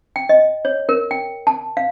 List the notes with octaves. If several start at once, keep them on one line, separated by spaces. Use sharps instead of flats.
G5
D#5
C#5
A#4
G5
A5
F5